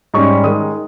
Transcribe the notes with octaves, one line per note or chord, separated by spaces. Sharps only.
G#2 G3 C#4 C#6
D#3 G#3 D#4 D#6